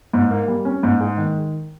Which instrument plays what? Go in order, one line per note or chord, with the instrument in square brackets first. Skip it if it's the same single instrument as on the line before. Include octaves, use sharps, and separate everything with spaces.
[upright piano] G#2
A#3
G3
C#4
G#2
G#3
D#3